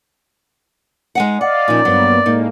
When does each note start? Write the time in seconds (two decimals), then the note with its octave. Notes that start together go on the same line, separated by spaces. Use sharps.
1.15 G#3 D#4 F#5
1.41 D5 D#5 F5 F#5
1.68 A#2 F3 C#4 D#4 A#4
1.85 G2 F#3 A#3 B3
2.26 A2 G#3 A#3 D#4